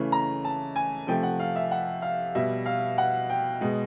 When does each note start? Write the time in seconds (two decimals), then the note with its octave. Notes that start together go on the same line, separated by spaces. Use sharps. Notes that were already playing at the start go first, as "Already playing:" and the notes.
Already playing: C#3 E3 A3
0.12 A#5
0.45 A5
0.76 G#5
1.07 C3 F3 A3 G5
1.23 F#5
1.40 F5
1.56 E5
1.71 F#5
2.02 F5
2.35 B2 G3 E5
2.66 F5
2.98 F#5
3.30 G5
3.61 B2 G#3